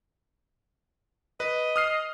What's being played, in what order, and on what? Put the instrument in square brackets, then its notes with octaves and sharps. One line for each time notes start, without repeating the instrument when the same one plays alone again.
[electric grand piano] B4 [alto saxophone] D#5
[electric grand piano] D#6 F6 C7